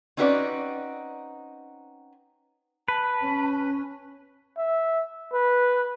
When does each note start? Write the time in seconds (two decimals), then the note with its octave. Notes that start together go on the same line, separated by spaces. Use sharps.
0.17 C4 C#4 D#4 F#4 B4 D5
2.88 B4 A5
3.21 C#4
4.57 E5
5.33 B4